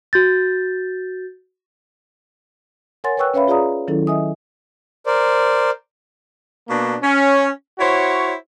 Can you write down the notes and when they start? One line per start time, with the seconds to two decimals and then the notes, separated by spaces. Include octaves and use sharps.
0.13 F#4 G6 A6
3.04 A#4 C#5 F#5 G#5 C6 A6
3.17 B4 C#5 G5 C#6 E6 F#6
3.34 C#4 B4 C#5 E5 F5 B5
3.48 F4 G#4 D5 F5 A#5 D#6
3.88 D#3 F#3 C#4 E4 A4
4.07 D#5 E5 G#5 D#6
5.06 A#4 C5 D5
6.69 B2 A#3 D4
7.03 C#4
7.79 E4 F#4 C5 C#5